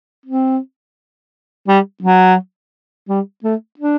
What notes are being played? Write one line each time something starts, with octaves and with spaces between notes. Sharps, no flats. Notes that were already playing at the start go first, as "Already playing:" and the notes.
C4
G3
F#3
G3
A3
D4